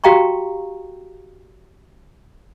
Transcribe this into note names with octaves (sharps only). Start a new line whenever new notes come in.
F#4 G4 F5 G5 A#5 C#6